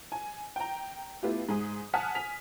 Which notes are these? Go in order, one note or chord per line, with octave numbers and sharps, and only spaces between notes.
G#5
G5 A#5
A3 B3 E4 F4 G4
G#2 G#4 D#6
F#5 G#5 A5 D#6 F6 B6
G#5 B6 F7